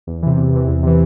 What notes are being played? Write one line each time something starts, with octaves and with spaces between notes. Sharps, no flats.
E2
C3 E3
E2
C3 E3
E2
C3 E3